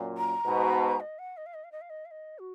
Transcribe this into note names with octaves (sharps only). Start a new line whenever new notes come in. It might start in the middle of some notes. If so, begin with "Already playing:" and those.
Already playing: F#2 A#2
A#5
G#2 B2
D#5
F#5
D#5
F5
D#5
F5
D#5
F5
D#5
F5
D#5
F#4